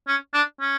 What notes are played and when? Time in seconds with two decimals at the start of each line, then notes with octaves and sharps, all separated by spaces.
0.08 C#4
0.34 D4
0.61 C#4